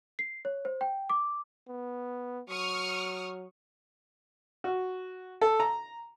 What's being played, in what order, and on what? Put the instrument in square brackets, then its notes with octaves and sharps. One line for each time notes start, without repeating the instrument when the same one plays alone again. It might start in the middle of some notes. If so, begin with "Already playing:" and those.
[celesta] C7
C#5
C5
G5
D6
[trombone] B3
[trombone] F#3 [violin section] C#6 D#6 F6
[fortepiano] F#4
A4
A#5